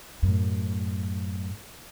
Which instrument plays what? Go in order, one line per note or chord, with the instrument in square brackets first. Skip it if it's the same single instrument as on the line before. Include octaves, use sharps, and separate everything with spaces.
[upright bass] F#2 A2